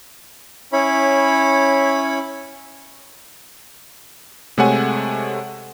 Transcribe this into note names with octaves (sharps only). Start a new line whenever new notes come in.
C#4 E4 C#5 B5
C3 G#3 A3 C#5 F#5 G#5